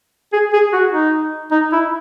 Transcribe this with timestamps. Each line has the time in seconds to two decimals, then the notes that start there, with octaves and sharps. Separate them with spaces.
0.33 G#4
0.53 G#4
0.73 F#4
0.93 D#4
1.52 D#4
1.72 E4